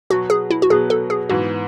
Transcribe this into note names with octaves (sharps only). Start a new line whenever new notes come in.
B2 F#3 B3 F#4
G#4
E4
F#4
B2 F#3 B3 G#4
A4
G#4
G#2 E3 B3 F#4